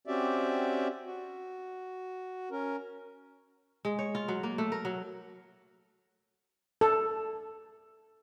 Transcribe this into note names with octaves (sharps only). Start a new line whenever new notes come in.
C4 C#4 F#4 G4 D5 E5
F#4
C#4 A#4
G#3
C#5
F4
F#3
A#3
A3
A#4
F#3
A4